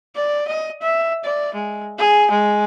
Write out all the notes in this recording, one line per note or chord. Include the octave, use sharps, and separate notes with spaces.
D5
D#5
E5
D5
G#3
G#4
G#3